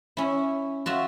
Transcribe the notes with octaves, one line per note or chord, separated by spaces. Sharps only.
C#4 E4
F4 F#4 E5